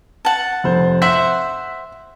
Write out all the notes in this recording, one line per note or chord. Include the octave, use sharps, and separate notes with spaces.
F#5 A5
F1 C5
C5 E5 F#5 B6